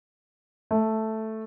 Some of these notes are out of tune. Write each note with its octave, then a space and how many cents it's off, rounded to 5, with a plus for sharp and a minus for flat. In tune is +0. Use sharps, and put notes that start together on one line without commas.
A3 +0